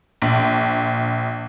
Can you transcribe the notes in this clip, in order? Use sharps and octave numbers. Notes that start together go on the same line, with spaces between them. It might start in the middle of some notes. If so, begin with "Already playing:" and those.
A#1